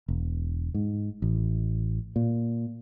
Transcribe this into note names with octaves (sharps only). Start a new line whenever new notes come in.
E1
G#2
A1
A#2